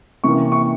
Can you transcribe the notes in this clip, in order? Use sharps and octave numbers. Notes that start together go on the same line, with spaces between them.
C3 E3 A#3 C#4 C#6
C#6